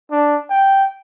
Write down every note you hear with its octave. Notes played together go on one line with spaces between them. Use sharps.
D4
G5